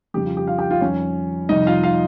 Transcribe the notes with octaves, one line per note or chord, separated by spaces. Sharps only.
F2 C#3 G3 G4
F4
G4
F4 F5
G4 G5
F4 F5
F2 D#3 G3 C#4 C#5
F2 C3 G3 D#4 D#5
F4 F5
F4 F5